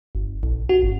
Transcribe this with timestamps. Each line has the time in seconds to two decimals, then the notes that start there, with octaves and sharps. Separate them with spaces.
0.15 G1
0.43 A#1
0.69 F#4
0.83 G1